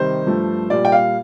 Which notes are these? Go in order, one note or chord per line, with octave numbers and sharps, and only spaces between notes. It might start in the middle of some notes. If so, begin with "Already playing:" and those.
Already playing: C3 D#3 G3 C5
G2 F3 A3
A#2 G3 D5
G5
F5